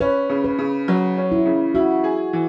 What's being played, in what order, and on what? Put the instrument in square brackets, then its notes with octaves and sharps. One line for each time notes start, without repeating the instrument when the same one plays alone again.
[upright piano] C#4 [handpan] B4
[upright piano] C#3
[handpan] B4
[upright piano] C#3
F#3
C#4
[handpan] E4
[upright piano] C#3
[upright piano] E4 [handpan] F#4
[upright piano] G#4
E3